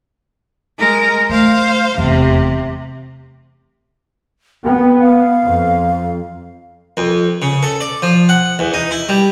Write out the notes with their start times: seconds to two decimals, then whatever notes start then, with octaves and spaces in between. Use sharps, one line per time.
0.78 G#3 A#4
1.30 A3 C5 F5
1.98 F1 E2 C3
4.65 B3 G5
5.00 F5
5.44 F2
6.97 F2
7.42 C#3
7.63 A4
7.81 D5
8.02 F3
8.29 F#5
8.59 E2
8.74 D#4
8.91 E4
9.09 G3